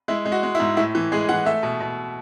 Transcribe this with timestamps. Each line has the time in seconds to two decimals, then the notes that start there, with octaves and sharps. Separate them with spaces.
0.08 G#3 E4
0.25 G#3
0.32 F#4
0.43 G#3
0.55 E4
0.60 G#2
0.77 A2 E4
0.95 E3
1.12 G#3 G#4
1.29 E3 F#5
1.46 A3 E5
1.63 B2
1.80 B2